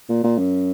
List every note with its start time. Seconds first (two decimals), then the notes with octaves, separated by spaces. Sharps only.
0.09 A#2
0.24 A#2
0.38 F#2